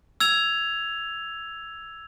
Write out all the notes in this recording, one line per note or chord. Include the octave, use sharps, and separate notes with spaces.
E6 G#6 F7